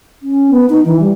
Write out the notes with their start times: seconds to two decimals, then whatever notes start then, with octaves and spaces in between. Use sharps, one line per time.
0.23 C#4
0.51 B3
0.70 D#4
0.85 E3
1.00 G3